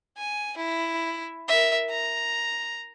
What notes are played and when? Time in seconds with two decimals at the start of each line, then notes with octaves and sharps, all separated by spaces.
0.17 G#5
0.57 E4
1.48 A#4 E5
1.90 A#5